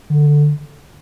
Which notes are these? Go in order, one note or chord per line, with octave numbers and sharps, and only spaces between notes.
D3